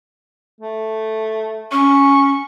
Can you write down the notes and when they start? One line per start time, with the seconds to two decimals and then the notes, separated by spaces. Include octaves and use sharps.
0.60 A3
1.71 C#4 C#6